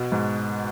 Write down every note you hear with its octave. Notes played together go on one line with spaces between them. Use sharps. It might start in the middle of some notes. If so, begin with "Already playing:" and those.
Already playing: B2
G#2